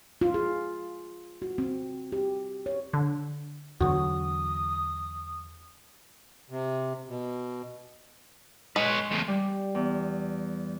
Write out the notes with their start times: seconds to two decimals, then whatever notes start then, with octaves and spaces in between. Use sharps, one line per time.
0.21 F4
0.34 G#4
1.42 F#4
1.58 C4
2.12 G4
2.66 C#5
2.93 D3
3.81 E2 D3 F#3 F#4 D#6
6.50 C3
7.08 B2
8.76 G#3 B4 C#5
9.11 E2 A2
9.28 G3
9.75 E2